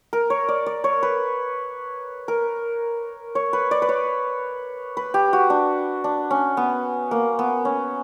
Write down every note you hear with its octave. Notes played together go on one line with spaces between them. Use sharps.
A#4
C#5
D5
D5
C#5
B4
A#4
C#5
B4
D5
B4
C#5
B4
G4
F#4
D4
D4
C#4
B3
A#3
B3
C#4